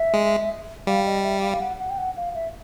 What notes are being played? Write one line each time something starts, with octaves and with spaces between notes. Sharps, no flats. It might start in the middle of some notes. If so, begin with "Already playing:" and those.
Already playing: E5
G#3
G3 F5
D#5
E5
F5
F5
F#5
F#5
G5
F#5
F5
E5